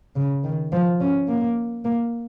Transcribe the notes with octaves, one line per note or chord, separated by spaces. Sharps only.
C#3
D#3
F3
C#4
A#3
A#3